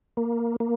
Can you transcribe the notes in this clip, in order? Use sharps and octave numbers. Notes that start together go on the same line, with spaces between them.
A#3
A#3